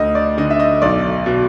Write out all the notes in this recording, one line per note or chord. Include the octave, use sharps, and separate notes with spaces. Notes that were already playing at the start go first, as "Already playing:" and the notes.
Already playing: D2 D#5
D5
D3 D#5
E5
D#5
B1 D5
B2